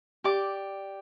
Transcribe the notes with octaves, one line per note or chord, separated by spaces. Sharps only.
G4 D5 D6